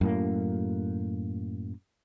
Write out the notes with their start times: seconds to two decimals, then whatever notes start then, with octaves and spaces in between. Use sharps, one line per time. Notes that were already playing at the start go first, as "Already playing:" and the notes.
0.01 F#2 A2 A#3